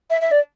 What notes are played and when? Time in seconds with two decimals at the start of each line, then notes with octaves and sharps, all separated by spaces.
0.10 E5
0.21 E5
0.31 D5